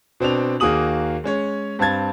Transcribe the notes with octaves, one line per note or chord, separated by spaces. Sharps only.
B2 C4 D4 F7
D#2 A#3 F#4 G#4 D#6 F#7
G#3 C#4 C#5
G2 C4 F5 A5 G#6 A6